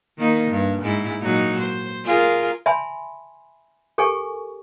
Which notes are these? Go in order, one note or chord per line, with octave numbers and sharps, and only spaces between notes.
D#3 A#3 D#4
G2
G#2 E4
A#2 F#3 D#4
C5
F4 G#4 A#4
E5 G#5 A5 B5 C6
G4 A4 A#4 G#5 C#6